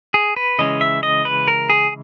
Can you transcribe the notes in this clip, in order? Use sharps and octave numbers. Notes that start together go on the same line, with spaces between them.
G#4
B4
C#3 E3 G#3 C#4 D#5
E5
D#5
B4
A#4
G#4